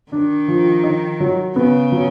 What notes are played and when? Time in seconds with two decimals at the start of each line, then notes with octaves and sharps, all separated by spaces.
0.11 D#3 D4
0.48 F3
0.84 D#4
1.20 F#3
1.56 C#3 B3
1.92 F#3